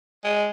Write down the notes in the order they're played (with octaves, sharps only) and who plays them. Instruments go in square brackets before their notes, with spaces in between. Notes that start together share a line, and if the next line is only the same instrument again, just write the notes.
[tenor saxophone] G#3